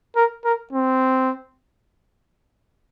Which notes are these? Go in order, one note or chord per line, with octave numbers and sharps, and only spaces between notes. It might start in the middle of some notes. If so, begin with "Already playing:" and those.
A#4
A#4
C4